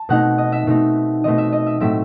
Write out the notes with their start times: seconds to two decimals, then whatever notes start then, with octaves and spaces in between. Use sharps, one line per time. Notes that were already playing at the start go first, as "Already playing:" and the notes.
Already playing: A5
0.09 B2 A3 C4 D#4 F#5
0.38 D#5
0.52 E5
0.67 B2 A3 C4 D#4
1.24 B2 A3 C4 D#4 D#5
1.38 E5
1.53 D#5
1.66 E5
1.80 A2 F#3 A3 C4 E5